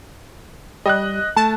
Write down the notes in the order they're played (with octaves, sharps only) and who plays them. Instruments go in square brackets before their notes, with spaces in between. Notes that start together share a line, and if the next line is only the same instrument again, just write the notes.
[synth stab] G3 [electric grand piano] D#5 F#6
[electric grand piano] A3 [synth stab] A5